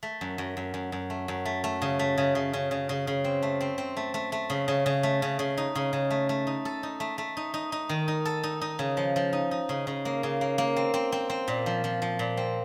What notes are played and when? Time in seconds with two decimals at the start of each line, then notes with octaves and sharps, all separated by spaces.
0.03 A3
0.21 F#2
0.38 F#2
0.57 F#2
0.74 F#2
0.92 F#2
1.10 A3
1.28 F#2
1.45 A3
1.64 A3
1.82 C#3
1.99 A3
2.18 C#3
2.35 C#3
2.53 C#3
2.71 C#3
2.89 C#3
3.07 C#3
3.24 C4
3.42 A3
3.61 C4
3.78 C4
3.97 A3
4.14 A3
4.32 A3
4.50 C#3
4.68 C#3
4.86 C#3
5.03 A3
5.22 C#3
5.39 C#3
5.57 D#4
5.75 C#3
5.93 C#3
6.10 A3
6.29 A3
6.47 D#4
6.65 A4
6.83 D#4
7.00 A3
7.18 A3
7.37 D#4
7.54 D#4
7.72 D#4
7.89 D#3
8.08 D#4
8.25 A4
8.43 D#4
8.61 D#4
8.79 C#3
8.97 F3
9.16 F3
9.33 D#4
9.51 D#4
9.69 C#3
9.87 C#3
10.05 A#3
10.23 C#3
10.41 A#3
10.58 A#3
10.76 C4
10.94 C4
11.12 C4
11.30 C4
11.48 A#2
11.66 F3
11.84 F3
12.02 F3
12.19 A#2
12.37 C4